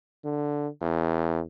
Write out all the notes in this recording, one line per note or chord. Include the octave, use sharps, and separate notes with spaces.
D3
E2